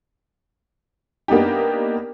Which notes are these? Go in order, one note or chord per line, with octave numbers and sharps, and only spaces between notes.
A#3 B3 D4 D#4 G4